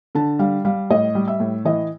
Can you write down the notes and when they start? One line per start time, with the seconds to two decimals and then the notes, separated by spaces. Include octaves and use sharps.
0.15 D3 A5
0.39 G3 F5
0.65 G3 F5
0.90 A2 D#5
1.15 G3
1.28 E5
1.40 A2
1.65 E3 D#5